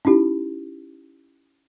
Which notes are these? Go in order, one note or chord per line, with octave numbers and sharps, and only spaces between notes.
C#4 D#4 E4 G4